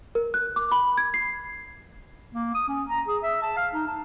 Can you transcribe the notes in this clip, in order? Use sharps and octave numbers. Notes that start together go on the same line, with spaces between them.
A#4
F#6
D6
B5
G#6
C7
A#3
D#6
C#4
A#5
G#4
E5
A5
F5
D#4
A5